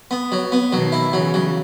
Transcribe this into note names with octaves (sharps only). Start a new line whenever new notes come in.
B3
F#3
B3
B2 D#3 F#3
E4
C#3 E3 F#3
F#3